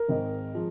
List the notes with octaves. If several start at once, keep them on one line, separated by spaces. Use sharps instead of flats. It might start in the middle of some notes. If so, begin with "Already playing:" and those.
Already playing: A#4
G#1 G#2 D#3 G#3 D#4
F3 G#3